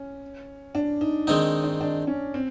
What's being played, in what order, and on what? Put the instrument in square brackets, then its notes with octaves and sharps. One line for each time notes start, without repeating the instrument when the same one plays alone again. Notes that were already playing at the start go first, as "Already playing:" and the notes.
Already playing: [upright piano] C#4
D4
D#4
[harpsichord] D#3 G#3 C4 D#4 [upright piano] D4
[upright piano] D4
D4
C#4
C4